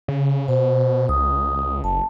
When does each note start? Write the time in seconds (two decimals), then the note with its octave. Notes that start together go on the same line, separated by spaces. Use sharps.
0.08 C#3
0.48 B2 C5
1.09 C#2 D#6
1.84 F#1 A5